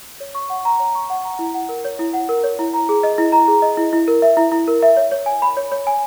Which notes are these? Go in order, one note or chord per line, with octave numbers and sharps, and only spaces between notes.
C#5
C#6
F#5
A#5
C#5
C#6
F#5
A#5
E4
F#5
A#4
C#5
E4
F#5
A#4
C#5
E4
A#5
G#4
D#5
E4
A#5
G#4
D#5
E4
E4
A#4
E5
E4
E4
A#4
E5
C#5
C#5
G#5
B5
C#5
C#5
G#5